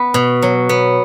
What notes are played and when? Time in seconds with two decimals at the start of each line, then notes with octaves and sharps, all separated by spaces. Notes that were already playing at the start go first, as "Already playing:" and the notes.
Already playing: B3 B4
0.14 B2
0.42 F#3
0.69 B3